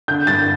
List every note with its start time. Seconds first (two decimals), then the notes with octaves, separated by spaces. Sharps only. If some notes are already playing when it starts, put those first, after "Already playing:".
0.08 D3 G6
0.27 G2 A6